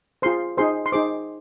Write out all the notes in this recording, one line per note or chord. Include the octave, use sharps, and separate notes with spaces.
F4 G#4 C5 C6
D#4 G#4 C5 C6
C6
D#4 G#4 C5 D6